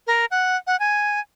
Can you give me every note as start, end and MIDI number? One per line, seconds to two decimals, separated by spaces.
0.07 0.25 70
0.31 0.56 78
0.67 0.78 78
0.80 1.20 80